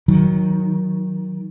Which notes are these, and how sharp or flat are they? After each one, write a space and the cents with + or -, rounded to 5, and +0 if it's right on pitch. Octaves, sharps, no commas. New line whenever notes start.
D#3 +15 F#3 +0